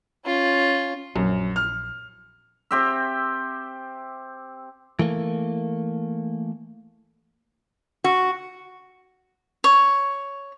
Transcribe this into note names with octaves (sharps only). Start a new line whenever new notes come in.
C#4 F4
A#1 F#2
F6
C4 G4 E5
E3 A3 A#3
F#4
C#5